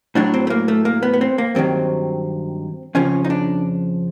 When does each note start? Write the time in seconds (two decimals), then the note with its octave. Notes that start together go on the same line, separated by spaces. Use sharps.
0.15 A2 F#3 D4
0.34 C4
0.47 A3
0.50 A#3
0.68 A3
0.85 A#3
1.03 B3
1.13 B3
1.21 C4
1.38 A#3
1.55 G2 D#3 F#3 C4
2.95 F2 C#3 F3 C#4
3.25 D#4
3.30 D4